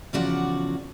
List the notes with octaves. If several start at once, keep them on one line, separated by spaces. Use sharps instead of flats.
E2 C#3 F3 F#4 D5 F#5